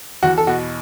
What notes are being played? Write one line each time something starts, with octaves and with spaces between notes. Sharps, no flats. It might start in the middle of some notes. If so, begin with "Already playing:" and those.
E2 F#4
A4
B2 F#4